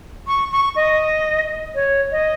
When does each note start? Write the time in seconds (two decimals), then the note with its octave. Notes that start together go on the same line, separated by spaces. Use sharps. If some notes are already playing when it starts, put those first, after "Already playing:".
0.27 C#6
0.52 C#6
0.76 D#5
1.75 C#5
2.11 D#5